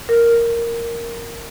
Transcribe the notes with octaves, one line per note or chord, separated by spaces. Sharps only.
A#4